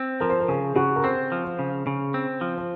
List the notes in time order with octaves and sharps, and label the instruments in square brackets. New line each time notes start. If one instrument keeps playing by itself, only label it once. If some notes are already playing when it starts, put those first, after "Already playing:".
Already playing: [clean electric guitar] C4
[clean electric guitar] F3 [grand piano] A#4
[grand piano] C5
A#4
[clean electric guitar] C#3 [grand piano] G#4
[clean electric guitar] C#3 [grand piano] F#4
[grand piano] A#4
[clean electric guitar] C4 [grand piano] C5
[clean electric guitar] F3
[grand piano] C5
[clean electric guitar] C#3
C#3
C4
F3
[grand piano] C5